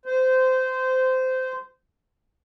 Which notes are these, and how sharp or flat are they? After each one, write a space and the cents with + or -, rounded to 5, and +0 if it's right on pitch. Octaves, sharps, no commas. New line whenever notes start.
C5 -20